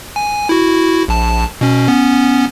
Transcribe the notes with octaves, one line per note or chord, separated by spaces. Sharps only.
G#5
E4 F#4
A#1 A5
B2 C#4
B3 C#4